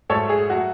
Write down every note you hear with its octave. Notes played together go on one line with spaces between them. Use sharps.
G#2 F#3 A3 A4 C#5
G#4
F#3 A3 F#4